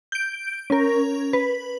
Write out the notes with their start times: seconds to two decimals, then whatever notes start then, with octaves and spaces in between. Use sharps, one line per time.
0.12 G6 D7
0.70 C#4 A#4
1.33 B4